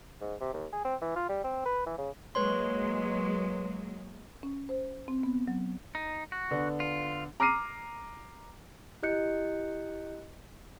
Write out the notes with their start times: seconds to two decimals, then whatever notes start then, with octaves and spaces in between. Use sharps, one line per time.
0.21 G#2
0.40 C3
0.53 D#2
0.73 G#4
0.85 C4
1.01 E3
1.16 F4
1.29 G3
1.44 C4
1.66 B4
1.86 E3
1.98 C#3
2.35 F#3 G#3 A#3 B4 C#5 C6
4.43 C#4
4.69 C5
5.08 C4
5.23 B3
5.48 F#3
5.95 D#4
6.32 F#4
6.51 D3 B3
6.80 F4
7.40 A#5 D6 F6 C7 D#7
9.03 E4 G4 D#5 F#6 G6 C#7